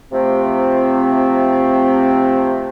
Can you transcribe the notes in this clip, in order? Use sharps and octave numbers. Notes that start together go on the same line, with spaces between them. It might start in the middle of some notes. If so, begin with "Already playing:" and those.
C3 F3 A3 C4